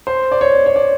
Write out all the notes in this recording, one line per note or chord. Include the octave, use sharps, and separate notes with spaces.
C5
D5
C#5
C#5
D5